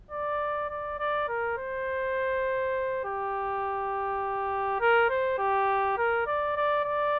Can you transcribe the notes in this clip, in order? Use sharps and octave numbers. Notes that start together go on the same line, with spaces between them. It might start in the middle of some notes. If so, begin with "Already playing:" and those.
D5
D5
D5
A#4
C5
G4
A#4
C5
G4
A#4
D5
D5
D5